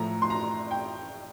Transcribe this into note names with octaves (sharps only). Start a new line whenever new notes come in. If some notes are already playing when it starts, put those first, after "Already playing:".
Already playing: A2 F3 A3 A#5
C6
A#5
G5